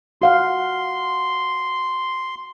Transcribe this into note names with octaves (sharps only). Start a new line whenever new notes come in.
F#4 F5 F#5 C6